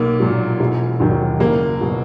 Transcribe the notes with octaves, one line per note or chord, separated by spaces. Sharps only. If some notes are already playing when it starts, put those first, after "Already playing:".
Already playing: B1 A#3
A#2 F#3
E1
D#2 D#3 F#3
F#1 A#3
B2 F#3